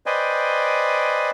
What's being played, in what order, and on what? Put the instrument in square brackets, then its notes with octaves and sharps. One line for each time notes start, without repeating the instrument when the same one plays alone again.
[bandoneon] B4 C5 D5 D#5 G5 G#5